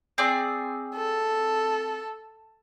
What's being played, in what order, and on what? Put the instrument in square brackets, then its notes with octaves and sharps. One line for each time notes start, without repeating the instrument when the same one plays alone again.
[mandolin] C4 G#4 D5
[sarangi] A4